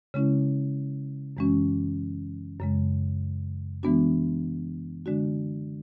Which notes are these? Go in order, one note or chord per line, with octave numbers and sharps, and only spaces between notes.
C#3 G#3 C#4 E4
F#2 E3 G#3 C#4 F#4
F#2 C#3 G#3
E3 G#3 B3 D4 F#4
D3 G#3 D4 F#4